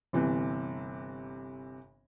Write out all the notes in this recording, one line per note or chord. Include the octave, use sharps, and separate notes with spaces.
G1 C3 E3